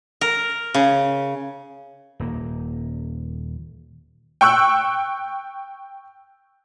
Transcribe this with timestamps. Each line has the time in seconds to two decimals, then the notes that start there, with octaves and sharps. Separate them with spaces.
0.21 A#4
0.74 C#3
2.20 D#1 A#3
4.41 G5 C#6 E6 F#6